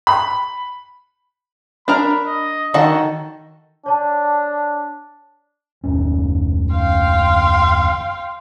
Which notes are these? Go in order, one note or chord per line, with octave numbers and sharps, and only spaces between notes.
B5
D4 A#4 A#5 B5
D#5
D#3 F#4 A4 D#5 F#5
D4 C#5 A5
F#1 D#2 C#4
F5 G5 C6